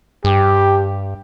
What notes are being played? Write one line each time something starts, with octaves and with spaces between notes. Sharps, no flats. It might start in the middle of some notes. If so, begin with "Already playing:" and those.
G2 G4